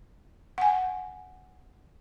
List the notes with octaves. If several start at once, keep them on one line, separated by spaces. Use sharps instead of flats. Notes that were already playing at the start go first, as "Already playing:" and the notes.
F#5 G#5